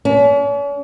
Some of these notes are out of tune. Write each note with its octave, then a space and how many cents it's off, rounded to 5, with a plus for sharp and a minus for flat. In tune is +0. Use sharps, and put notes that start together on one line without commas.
C#4 +45